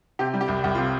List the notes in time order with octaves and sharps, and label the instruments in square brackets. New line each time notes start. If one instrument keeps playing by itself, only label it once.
[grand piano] C3 G4
G3
G4
C2
C2 G4
F4
C3